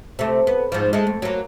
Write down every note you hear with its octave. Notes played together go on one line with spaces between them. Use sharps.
C3 A3
B3
G#2 F3
G#3 A3
F2
F#3 A#3